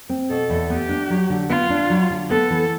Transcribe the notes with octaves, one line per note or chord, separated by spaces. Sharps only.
C4
B2 A4
E2
B3 G4
D4
F#3
D3
B3 F4
D4
F#3
D3
B3 A4
E3